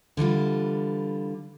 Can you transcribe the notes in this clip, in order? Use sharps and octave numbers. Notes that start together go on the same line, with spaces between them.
D3 E3 G3 F4